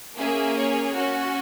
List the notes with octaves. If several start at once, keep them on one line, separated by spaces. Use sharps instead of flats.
A#3 C#4 G#4 E5
C#5
C#4 F#4